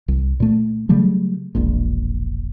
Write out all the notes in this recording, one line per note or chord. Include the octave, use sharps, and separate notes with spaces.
C2
A#2 A3
C#3 F#3 G3 A3
E1 A#1 A#2